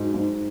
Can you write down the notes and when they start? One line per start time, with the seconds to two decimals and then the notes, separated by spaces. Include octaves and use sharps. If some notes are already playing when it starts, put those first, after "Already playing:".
Already playing: G#2 F#3
0.14 G#2